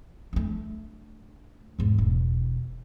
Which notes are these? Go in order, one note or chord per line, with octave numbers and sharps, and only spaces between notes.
A3 D4
E2 G#2
E1